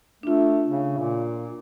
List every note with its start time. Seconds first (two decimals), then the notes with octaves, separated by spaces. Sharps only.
0.23 A3 D4 F4
0.67 C#3
0.98 A#2